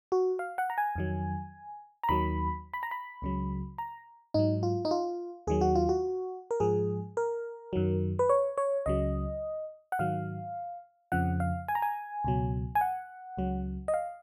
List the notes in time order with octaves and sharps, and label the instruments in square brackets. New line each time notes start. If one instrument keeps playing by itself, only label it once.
[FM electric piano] F#4
F5
F#5
A#5
G#5
F2 D#3 F#3
A#5
D#2 D#3 F#3 B5
B5
A#5
B5
C#2 C#3 F#3
A#5
G#2 F#3 D#4
F4
D#4
F4
D#2 D#3 F#3 G#4
F#4
F4
F#4
A#4
G#2 F3 G#4
A#4
F#2 D#3 F#3
B4
C#5
C#5
C#2 C#3 F#3 D#5
F#5
G#2 D#3 F#3 F5
F2 C#3 F3 F#5
F5
G#5
A#5
G#5
C#2 B2 F#3
G#5
F#5
C#2 C#3 F#3
D#5
F5